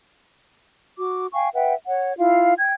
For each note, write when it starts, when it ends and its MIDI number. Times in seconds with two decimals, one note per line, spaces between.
0.98 1.27 66
0.98 1.27 86
1.32 1.48 77
1.32 1.48 79
1.32 1.48 80
1.32 1.48 85
1.54 1.73 71
1.54 1.73 76
1.54 1.73 78
1.54 1.73 79
1.86 2.13 73
1.86 2.13 78
2.17 2.52 64
2.17 2.52 65
2.17 2.52 77
2.58 2.73 79
2.58 2.73 92